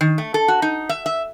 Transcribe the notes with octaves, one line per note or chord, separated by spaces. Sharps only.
D#3
A3
A4
F#4
D#4
E5
E5